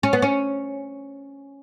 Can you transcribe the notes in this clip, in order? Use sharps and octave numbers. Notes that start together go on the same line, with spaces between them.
C#4
B3
C#4